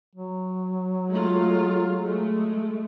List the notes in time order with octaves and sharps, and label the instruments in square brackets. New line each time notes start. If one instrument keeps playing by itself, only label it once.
[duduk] F#3
[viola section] G#3 A3 F4
G#3 A3